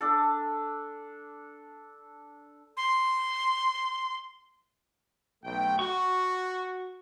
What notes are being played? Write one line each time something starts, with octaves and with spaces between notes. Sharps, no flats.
D4 A4
C6
B1 A3 G5
F#4 C#6